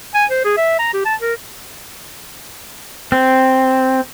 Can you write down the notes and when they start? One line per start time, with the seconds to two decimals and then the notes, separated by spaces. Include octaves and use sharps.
0.15 G#5
0.30 C5
0.45 G#4
0.57 E5
0.79 A#5
0.94 G4
1.05 A5
1.21 A#4
3.12 C4